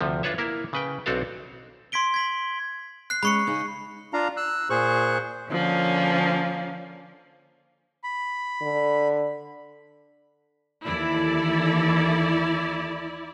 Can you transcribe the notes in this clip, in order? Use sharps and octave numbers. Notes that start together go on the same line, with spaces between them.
D2 C3 F3
D4 F4 B4 C#5 E5
A#3 E4 A#4
C#3 B4 G5
B1 C4 D4 F#4 A4 F5
C6 G#6 B6 D7 G7
G#6 B6 F#7
F#6 C7
G#3 C#4 B5 C#6 C#7
C#3 D#4 G#4
D4 F4 F5 A#5
E6 F#6
A#2 G#4 C5 C#6 F#6
D3 F3 A#3 C#4
B5
D3
D#2 E3 E4 A4 D5